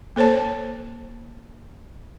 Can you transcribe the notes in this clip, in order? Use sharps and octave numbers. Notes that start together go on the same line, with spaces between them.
A#3 A4 C5 C#5 A5